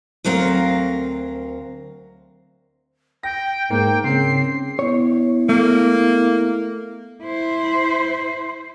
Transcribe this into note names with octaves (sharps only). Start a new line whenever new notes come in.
D2 F#3 C4 A#4 F5
G5 A#6
G#2 A#3 G5
C#3 C4 C7
B3 E4 C#5
A3 A#3
E4 C5